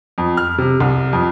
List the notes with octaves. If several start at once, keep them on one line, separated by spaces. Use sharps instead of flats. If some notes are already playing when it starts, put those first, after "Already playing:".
F2
F6
C3
C2
F2